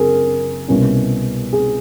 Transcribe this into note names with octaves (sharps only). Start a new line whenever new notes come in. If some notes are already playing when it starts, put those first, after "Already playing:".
Already playing: F#1 C3 G#4 A#4
C2 B2 G3 A#3 C#4
G#4